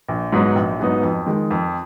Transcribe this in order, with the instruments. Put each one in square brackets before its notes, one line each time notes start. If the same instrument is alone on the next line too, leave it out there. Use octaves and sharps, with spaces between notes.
[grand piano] A#1
G#2 F#3 B3 D#4
A#1
G#2 F#3 B3 D#4
F2
D#3 G#3
F2